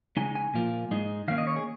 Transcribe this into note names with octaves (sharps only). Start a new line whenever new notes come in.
C#3 G#3 D#4 G#5
G#5
A#2 F3 A#3 F4
G#2 G#3 D#4
D#3 A#3 C#4 F5
D#5
C#5
G#4